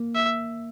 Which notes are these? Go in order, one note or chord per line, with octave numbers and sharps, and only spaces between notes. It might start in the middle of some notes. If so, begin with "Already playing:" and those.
Already playing: A#3
E5